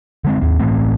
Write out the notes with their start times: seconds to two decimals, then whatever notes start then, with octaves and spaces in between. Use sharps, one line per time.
0.24 D3 G#3 C4
0.41 D#2 C4
0.59 A2 E3 A3 C4